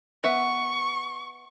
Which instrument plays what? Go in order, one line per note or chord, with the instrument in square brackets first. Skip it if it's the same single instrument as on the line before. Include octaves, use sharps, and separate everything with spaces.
[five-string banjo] B3 E5 F#5 [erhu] C#6